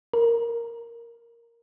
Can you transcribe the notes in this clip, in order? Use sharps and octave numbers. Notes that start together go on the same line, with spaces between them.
A#4